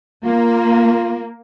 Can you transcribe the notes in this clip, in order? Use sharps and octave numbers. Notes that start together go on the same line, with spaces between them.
A#3 F4